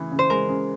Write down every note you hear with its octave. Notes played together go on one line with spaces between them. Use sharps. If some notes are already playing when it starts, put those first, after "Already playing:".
Already playing: C#3 E3
C#3
C5
G#3 A#4
C#3